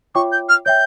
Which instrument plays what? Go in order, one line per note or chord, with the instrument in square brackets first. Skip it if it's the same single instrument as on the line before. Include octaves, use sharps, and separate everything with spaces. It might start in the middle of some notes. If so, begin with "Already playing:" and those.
[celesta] F4 C#5 E5 G5 D6 [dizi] C#6
[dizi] G6
F6
[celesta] C#5 E5 G5 [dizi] G6